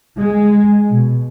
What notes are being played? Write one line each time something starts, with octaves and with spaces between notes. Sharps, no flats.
G#3
B2